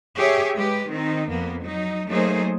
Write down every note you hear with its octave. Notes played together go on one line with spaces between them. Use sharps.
G4 G#4 C#5 E5
G#3 G4 B4
D#3 C4 D#4
F2 A#3 B3
F#3 D#4
F#3 A3 A#3 D#4 G#4 C5